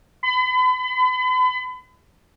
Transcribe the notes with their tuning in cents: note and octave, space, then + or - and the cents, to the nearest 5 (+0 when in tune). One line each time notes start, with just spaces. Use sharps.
B5 +40